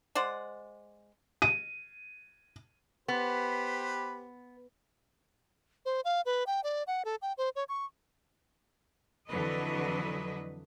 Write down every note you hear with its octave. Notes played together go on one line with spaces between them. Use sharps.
G#3 C5 D5 F#5
D#7
B3 G4 B4 C5
C5
F5
B4
G5
D5
F#5
A4
G5
C5
C#5
C#6
F2 D3 E3 F#3 B4 D#5